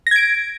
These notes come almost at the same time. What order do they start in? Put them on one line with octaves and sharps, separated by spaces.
A#6 G#6 D7